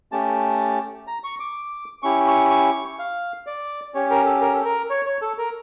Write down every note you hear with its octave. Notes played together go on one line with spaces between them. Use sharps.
A3 C#4 G4 A5
A#5
C#6
D6
C#4 E4 G4 C#6
C#6
C#6
F5
D5
C#4 G4 C#5
A#4
A4
A#4
A4
A#4
C#5
C#5
A4
A#4